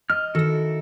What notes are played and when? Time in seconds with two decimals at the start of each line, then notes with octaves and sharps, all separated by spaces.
0.10 D#5 F6
0.35 D#3 E4 F#4 A4